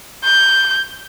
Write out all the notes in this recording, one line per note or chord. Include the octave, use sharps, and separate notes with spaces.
G6